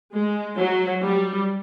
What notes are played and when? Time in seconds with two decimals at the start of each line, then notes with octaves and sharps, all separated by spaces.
0.13 G#3
0.58 F#3
1.03 G3